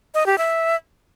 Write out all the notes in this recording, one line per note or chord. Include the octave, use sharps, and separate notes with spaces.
D#5
G4
E5